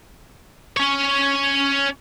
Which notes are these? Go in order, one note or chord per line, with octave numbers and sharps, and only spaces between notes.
C#4 C#5